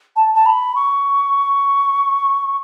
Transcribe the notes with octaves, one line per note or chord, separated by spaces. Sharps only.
A5
A5
B5
C#6